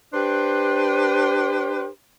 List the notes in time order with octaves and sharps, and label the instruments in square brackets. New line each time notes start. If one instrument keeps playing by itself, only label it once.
[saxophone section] D4 G4 B4 C5